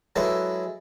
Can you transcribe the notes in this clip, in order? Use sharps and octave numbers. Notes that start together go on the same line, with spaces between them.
F#3 G#3 E4 A4 B4